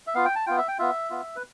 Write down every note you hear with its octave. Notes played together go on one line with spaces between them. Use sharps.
E5
B3 F4 F5
G5
A5
B3 F4 G5
E5
G5
B3 F4 E5
B3 F4
B4